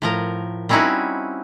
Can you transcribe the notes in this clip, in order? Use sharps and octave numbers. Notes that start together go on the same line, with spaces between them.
A2 F3 A#4
G3 C4 C#4 D#4 E4 F#4